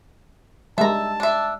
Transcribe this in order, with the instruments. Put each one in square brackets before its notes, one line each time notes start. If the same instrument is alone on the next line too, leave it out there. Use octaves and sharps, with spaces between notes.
[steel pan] G3 G#3 [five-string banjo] E5 A#5 [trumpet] A5
[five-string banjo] D4 E5